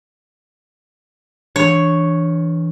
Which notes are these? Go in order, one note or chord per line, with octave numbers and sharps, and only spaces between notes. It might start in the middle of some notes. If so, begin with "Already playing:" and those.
E3 D4 C#5